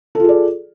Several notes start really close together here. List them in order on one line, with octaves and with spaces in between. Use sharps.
A4 F4 G#4 D5